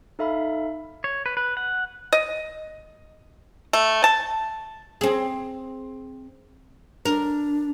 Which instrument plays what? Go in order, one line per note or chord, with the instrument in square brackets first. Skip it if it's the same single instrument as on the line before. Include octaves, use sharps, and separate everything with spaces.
[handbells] D#4 A4 E5 F5 B5
[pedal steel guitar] C#5
B4
B4
F#5
[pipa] D#5
A3
A5
[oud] C4 G#4
[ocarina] D4 [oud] A#4